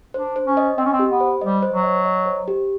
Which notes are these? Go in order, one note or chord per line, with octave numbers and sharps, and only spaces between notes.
D4 C5
C5
C#4
D#5
C4 D#5
C#4
C4
G4
B3
C5
G3 D#5
C5
F#3
D#5
D#5
C5
G4